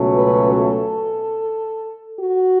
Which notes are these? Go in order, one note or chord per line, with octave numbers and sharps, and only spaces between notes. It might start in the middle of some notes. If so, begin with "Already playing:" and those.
Already playing: C#2 B2 F#3 A3 C#4
B4
A4
F#4